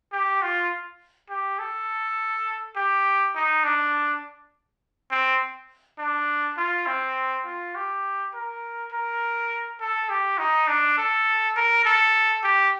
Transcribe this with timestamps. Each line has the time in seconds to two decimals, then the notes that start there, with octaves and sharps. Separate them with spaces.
0.12 G4
0.42 F4
1.30 G4
1.59 A4
2.76 G4
3.35 D#4
3.64 D4
5.11 C4
5.98 D4
6.57 F4
6.87 C4
7.46 F4
7.75 G4
8.34 A#4
8.92 A#4
9.80 A4
10.10 G4
10.38 D#4
10.68 D4
10.98 A4
11.56 A#4
11.85 A4
12.44 G4